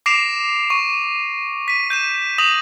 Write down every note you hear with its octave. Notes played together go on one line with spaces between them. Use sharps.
D6 A#6 C7 D7 E7 F7
C#6
B6 D#7
G6 D#7 E7
D#6 A#6 F7 F#7